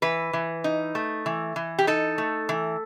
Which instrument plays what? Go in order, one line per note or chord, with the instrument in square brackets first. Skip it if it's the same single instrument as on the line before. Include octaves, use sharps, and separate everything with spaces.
[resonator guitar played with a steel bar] E3 B4
E3
D#4
A3
E3
E3
G4
D#4 A4
A3
E3